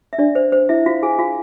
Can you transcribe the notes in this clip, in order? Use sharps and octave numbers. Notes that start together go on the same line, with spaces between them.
E5
D4 D5
C5
C5
E4 E5
F4 F5
G#4 G#5
F4 F5